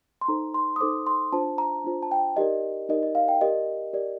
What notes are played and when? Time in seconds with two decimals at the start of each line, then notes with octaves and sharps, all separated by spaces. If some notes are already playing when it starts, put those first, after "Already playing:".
0.21 C6
0.28 D#4 A4 C5 A#5
0.54 C6
0.76 D#6
0.81 D#4 A4 C5 D6
1.07 C6
1.32 D4 F4 C5 A5
1.58 A#5
1.84 D4 F4 C5
2.03 A5
2.11 G5
2.37 D#4 G4 A#4 D5 D#5
2.89 D#4 G4 A#4 D5 D#5
3.03 D#5
3.15 F5
3.28 G5
3.41 G4 A#4 D5 D#5
3.93 G4 A#4 D5